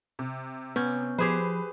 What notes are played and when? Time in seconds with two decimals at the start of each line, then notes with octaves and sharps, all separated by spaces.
0.19 C3
0.76 B3 C#4 G6
1.19 F3 G4 G#4 B4 C5